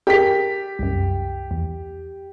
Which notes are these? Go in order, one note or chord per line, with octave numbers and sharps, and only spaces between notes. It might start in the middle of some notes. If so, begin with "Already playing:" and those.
G4 G#4 A#4 B6
C2 F#2
E2